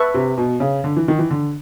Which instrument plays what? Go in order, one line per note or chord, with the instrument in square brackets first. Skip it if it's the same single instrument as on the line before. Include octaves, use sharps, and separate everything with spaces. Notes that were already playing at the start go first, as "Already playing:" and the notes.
Already playing: [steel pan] B4 E5 A5 C#6
[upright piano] C3
B2
C#3
D3
E3
D#3
E3
D3